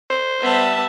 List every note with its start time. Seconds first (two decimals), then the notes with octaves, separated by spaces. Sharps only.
0.10 C5
0.42 G3 B3 E5 A5